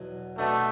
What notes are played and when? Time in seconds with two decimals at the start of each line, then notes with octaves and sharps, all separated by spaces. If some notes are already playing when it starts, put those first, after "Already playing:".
Already playing: E2 B2 F#3
0.38 B2 A3 B3 D4